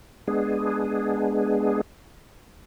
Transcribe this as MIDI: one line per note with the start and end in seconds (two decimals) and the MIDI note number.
0.28 1.81 56
0.28 1.81 59
0.28 1.81 62
0.28 1.81 68